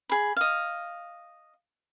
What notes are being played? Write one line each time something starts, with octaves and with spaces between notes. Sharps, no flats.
G#4 B5
D#5 F5